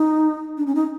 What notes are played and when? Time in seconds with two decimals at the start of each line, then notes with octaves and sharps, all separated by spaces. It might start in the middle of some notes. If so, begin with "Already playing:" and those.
Already playing: D#4
0.57 D4
0.67 C#4
0.75 D#4